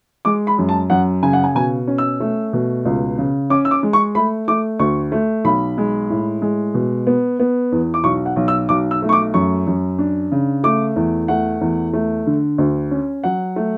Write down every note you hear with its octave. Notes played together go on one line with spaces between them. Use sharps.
G#3 D6
B5
F#2
A5
F#2 F#5
C#3 G#5
F#5
G#5
B2 G#5
C#4
E6
A3
B2
C#2
C#3
C#4 D6
E6
D6
G#3
C#6
A3 B5
A3 D6
D2 C#6
A3
B1 B5
G#3
A2
G#3
B2
B3
B3
E2
D6
B1 C#6
F#5
B1
E6
B1 D6
E6
A3
C#6
D6
F#2 C#6
F#2
D4
C#3
A3 D6
E2
A3 F#5
E2
A3
D3
D2
C#4
F#3 F#5
A3